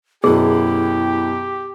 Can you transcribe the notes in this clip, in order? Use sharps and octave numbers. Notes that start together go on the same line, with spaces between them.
F#2 B2 E4 G4 G#4